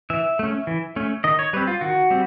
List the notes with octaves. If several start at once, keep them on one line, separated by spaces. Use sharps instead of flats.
E3 E5
A3 C#4
E3
A3 C#4
D#3 D#5
C#5
G3 C4 B4
F4
D#3 F#4
G3 C4